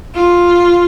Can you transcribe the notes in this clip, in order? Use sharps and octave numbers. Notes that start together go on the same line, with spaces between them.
F4